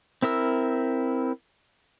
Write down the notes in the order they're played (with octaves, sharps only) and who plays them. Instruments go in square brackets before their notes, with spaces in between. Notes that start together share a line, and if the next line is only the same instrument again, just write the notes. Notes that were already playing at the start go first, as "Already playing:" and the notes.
[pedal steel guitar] C4 E4 A#4 E6